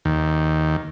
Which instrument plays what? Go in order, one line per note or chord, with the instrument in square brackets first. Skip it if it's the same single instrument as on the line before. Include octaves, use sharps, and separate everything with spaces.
[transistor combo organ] D#2